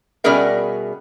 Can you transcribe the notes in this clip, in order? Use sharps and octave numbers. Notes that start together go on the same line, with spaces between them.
B2 G3 C#4 G#4 A#4 E5